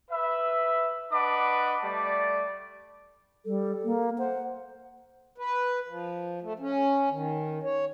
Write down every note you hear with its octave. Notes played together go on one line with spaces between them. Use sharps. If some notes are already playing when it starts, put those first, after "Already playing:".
B4 E5
D4 B4 D#5 F#5 D6
G3 A3 D5
G3 A4
A#3
C5 F#5
B4
F3
A3
C#4
D#3
C#5